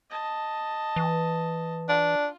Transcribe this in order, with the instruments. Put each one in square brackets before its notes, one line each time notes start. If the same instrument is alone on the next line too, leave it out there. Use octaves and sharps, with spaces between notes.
[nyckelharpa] D#5 A5
[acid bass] E3
[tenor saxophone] D4 [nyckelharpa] F4